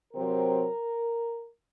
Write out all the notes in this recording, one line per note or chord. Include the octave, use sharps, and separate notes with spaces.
C3 F#3 C4 A#4